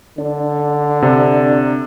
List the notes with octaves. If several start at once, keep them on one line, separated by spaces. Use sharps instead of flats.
D3 D4
C3